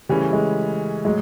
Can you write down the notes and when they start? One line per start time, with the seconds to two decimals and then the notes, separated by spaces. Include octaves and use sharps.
0.09 C#3 E3 G3 A3 C#4
0.33 G#3
1.05 A2 F#3 G#3